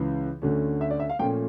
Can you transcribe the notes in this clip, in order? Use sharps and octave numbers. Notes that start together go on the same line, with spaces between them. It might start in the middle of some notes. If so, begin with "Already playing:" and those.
Already playing: C#2 C#3 E3
D2 D3 A3 C#4
E5
D5
E5
F5
A#2 F3 A3 C#4 G5